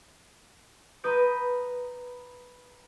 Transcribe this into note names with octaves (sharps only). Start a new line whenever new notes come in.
B4 A#5 D#6 G6 D7